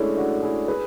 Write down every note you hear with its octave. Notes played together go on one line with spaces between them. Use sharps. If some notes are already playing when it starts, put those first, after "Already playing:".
Already playing: G#3 A3 C#4 D4 E4
D4 F#4
E4 G#4
G#4 B4